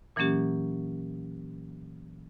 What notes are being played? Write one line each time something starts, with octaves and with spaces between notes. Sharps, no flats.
A#2 E3 F#3 A#3 C#4 G4